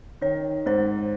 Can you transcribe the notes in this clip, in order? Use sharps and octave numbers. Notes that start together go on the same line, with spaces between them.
D#3 C#5
G#2 C5